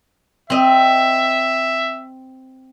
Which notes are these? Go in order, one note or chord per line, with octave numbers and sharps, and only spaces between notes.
C4 D#5 E5